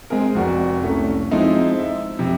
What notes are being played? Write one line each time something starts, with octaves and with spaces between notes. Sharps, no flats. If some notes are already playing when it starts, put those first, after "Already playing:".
G#3 C4 G#4 A#4
F1 F#4 A#4 D5
C2 A3 C#4
F3 G#3 C4 D#4 E4
E5
F2 C3